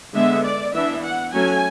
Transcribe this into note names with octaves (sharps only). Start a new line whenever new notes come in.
D3 G#3 B3 E5
D5
E3 B3 D4 E5
F#5
F#3 A3 C#4 G#5